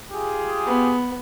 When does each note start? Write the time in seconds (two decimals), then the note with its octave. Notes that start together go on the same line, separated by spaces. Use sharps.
0.13 F4 G4 G#4
0.66 B3